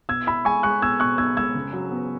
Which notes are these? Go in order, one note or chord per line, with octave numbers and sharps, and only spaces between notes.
B2 E6 G#6
E4 B5 E6
G#3 G#5 C#6
G#3 C#6 F#6
B2 E6 G#6
B2 C#6 F#6
B1 E6 G#6
G#3 E6 G#6
C#3
F#3
B3